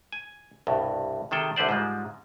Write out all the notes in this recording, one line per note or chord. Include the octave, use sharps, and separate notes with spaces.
G#5
C2 G2 B2
C3 D#3 G#4 A4 G5
C2 D3 B4 C5 D5
G#2 F3 G3 G#3